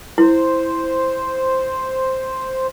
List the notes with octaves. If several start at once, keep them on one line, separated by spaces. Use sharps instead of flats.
E4 C5